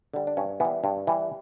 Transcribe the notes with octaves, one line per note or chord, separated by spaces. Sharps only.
D3 G3
D4
G2 C#4
E3 G3 B3
G2
E3 G3